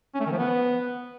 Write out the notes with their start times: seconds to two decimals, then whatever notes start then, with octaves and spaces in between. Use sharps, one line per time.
0.14 C#4
0.20 A3
0.26 D#3
0.32 F3
0.38 B3